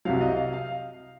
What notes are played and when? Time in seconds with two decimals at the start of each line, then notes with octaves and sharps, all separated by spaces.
0.05 C2 C3 F#3 F5
0.21 D#5
0.36 F5
0.53 F5